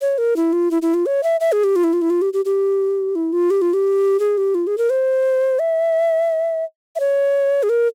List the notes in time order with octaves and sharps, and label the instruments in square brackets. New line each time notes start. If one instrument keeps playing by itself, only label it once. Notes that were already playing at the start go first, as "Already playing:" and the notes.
[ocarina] C#5
A#4
E4
F4
E4
E4
F4
C#5
E5
E5
G#4
G4
F4
E4
F4
E4
F4
G4
G4
G4
E4
F4
G4
F4
G4
G#4
G4
F4
G#4
A#4
C5
E5
E5
C#5
G#4
A#4